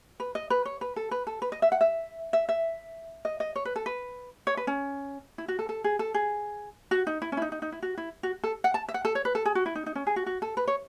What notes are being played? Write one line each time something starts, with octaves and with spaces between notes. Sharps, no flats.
B4
D#5
B4
C#5
B4
A4
B4
A4
B4
D#5
E5
F#5
E5
E5
E5
D#5
D#5
C#5
B4
A4
B4
C#5
B4
C#4
E4
F#4
A4
A4
G#4
A4
G#4
F#4
D#4
E4
C#4
E4
D#4
D#4
D#4
E4
F#4
E4
F#4
A4
F#5
A5
E5
F#5
A4
C#5
B4
A4
G#4
F#4
E4
D#4
D#4
C#4
G#4
F#4
F#4
A4
B4
C#5